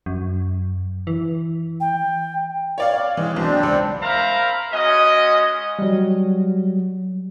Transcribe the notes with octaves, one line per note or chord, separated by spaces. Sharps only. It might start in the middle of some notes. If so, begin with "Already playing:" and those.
F#2
E3
G5
C#5 D5 F5
E3 G#3
B1 C4 D4
C#2
A#4 C5 E5 F5 A#5 B5
G#3 C#4 F#4 D#5
F#3 G3